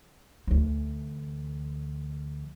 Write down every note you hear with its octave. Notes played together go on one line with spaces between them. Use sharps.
D2 E3